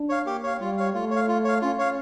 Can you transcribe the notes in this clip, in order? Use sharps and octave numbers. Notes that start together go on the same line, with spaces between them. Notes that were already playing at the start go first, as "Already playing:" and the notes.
Already playing: D4
C#5 F5
A#3 G4
C#5 F5
G3 F4
C#5 F5
A3 F4
C#5
F5
F4
C#5 F5
C#4 F4
C#5 F5